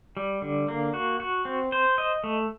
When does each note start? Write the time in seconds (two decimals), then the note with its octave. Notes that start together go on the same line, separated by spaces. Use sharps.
0.17 G3
0.42 D3
0.68 A#3
0.94 F#4
1.20 F#4
1.45 C4
1.72 C5
1.98 D#5
2.24 A3